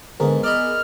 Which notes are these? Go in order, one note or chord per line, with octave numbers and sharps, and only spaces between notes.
G#2 D3 B3 G#4 A#4
D5 D#5 B5 F6